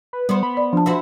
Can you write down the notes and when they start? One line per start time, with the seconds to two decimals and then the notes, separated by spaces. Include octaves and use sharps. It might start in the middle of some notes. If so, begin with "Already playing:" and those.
0.13 B4
0.29 G3 B3 C5
0.43 B5
0.57 D5
0.73 F3 D4 A5
0.86 E4 F#4 C5